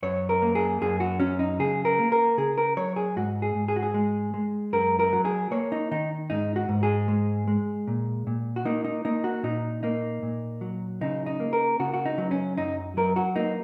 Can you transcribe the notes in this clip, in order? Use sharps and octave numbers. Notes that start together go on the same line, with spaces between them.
F#2 C#5
A#4
A#3
G#4
F#2 G#4
F#4
F#3 C#4
D#4
C#3 G#4
A#4
A#3
A#4
C#3 G#4
A#4
F#3 C#5
G#4
G#2 F#4
G#4
G#2
G#4
F#4
G#4
G#3
G#3
F#2 A#4
A#4
F#3
G#4
A#3 C#5
D#4
D#3 D#4
G#2 D#4
F#4
G#2
G#4
G#3
G#3
A#2
A#2
F#4
A#3 D#4
D#4
A#3 D#4
F#4
A#2 D#4
A#3 D#4
A#2
F#3
C#3 D#4
D#4
A#3
A#4
C#3 F#4
F#4
D#4
F#3
C#4
F#2 D#4
F#3 A#4
F#4
A#3 D#4